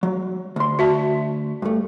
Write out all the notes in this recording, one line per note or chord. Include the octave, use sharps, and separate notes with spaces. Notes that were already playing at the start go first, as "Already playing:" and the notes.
F#3
D2 C6
F#4 E5 A5
G2 A3